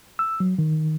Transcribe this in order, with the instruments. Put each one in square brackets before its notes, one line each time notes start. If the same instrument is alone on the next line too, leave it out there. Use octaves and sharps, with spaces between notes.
[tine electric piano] E6
F#3
D#3